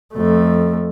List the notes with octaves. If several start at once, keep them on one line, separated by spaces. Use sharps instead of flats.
F2 A3